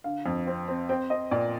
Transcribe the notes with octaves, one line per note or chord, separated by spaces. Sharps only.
D3 F5
F2
C4
C4
C4 G5
C4 D#5
A#2 D5